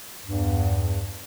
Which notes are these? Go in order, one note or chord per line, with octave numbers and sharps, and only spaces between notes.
E2 G2